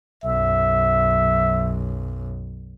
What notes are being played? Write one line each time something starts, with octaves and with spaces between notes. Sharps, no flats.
B1 F#2 E5